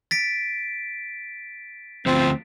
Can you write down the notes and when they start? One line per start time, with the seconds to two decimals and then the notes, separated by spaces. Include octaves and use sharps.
0.11 A6 B6 D7
2.06 D2 F3 C4